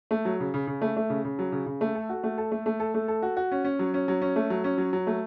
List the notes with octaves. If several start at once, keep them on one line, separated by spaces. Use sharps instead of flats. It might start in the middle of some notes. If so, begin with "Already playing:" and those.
A3
F#3
C#3
C#3
C#3
A3
A3
C#3
C#3
F#3
C#3
C#3
A3
A4
F#4
A3
A4
A3
A3
A4
A3
A4
F#4
F#4
C#4
C#4
F#3
C#4
F#3
C#4
A3
F#3
C#4
F#3
F#3
A3